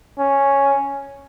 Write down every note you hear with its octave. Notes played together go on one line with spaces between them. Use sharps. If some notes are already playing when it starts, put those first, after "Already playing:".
C#4